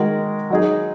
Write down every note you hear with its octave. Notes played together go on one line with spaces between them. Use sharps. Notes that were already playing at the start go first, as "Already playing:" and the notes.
Already playing: D#3 G#3 F#4 A#4
F#3 D#4 G#4